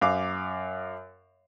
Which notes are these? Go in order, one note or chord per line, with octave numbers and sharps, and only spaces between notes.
F#2 F5 D6